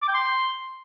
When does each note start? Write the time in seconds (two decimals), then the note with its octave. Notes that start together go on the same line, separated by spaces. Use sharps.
0.02 D6
0.08 G5
0.14 C6